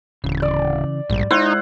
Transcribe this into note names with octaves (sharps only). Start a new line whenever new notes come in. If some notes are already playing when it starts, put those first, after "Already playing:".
D1 C#3 E3
D5
A#1 G#2 G3
G#3 D#4 E4 C5 F#5